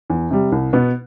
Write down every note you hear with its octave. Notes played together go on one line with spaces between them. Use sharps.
E2
C3 G3
C2
B2 B3